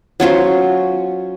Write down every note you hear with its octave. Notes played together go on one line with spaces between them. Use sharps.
F#3 C#4 F4 C5